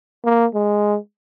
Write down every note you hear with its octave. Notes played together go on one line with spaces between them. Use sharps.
A#3
G#3